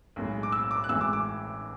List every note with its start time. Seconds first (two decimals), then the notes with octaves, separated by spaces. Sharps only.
0.16 B1 A2 G#3
0.43 D6
0.52 E6
0.71 D6
0.84 F#6
0.88 A1 A2 E3 G#3 E6
1.01 D6
1.13 D6